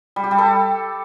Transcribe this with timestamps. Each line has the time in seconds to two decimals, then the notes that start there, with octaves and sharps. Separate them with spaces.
0.16 G3
0.24 G4
0.31 G3
0.38 A4